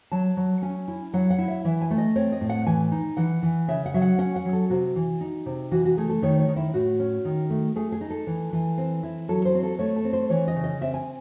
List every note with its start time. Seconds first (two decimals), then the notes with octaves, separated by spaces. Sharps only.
0.12 F#3 A5
0.37 F#3
0.62 C#4 G#5
0.88 E4
1.13 F#3 F#5
1.30 F#5
1.38 E4
1.48 E5
1.65 E3 E5
1.82 G#5
1.91 A3
1.98 D#5
2.16 C4 C#5
2.32 D#5
2.41 A2
2.49 F#5
2.66 E3 G#5
2.92 D#4
3.17 E3 F#5
3.43 E3
3.68 C#3 E5
3.86 F#5
3.94 F#3 E5
4.02 F#5
4.18 C#4 F#5
4.36 F#5
4.45 F#3
4.53 A4
4.70 C3 F#4
4.96 E3
5.21 D#4
5.46 C3
5.71 E3 F#4
5.85 F#4
5.97 A3 G#4
6.10 A4
6.22 D#3 C#5
6.39 C#5
6.48 D#3
6.56 E4
6.74 A2 F#4
7.00 C#4
7.25 D#3
7.50 A3
7.76 A3 G#4
7.92 G#4
8.01 D#4
8.10 A4
8.27 E3
8.53 E3
8.78 C4
9.03 E4
9.29 F#3 A4
9.45 C5
9.55 C4
9.63 A4
9.79 A3 C#5
9.96 A4
10.04 C4
10.13 C5
10.30 E3 C#5
10.48 D#5
10.56 C#3
10.64 D#5
10.81 C4 E5
10.94 G#5